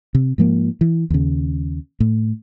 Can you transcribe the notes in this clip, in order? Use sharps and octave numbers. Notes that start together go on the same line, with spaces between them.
C3
G#2 F3 A#3
E3
D#2 C#3
A2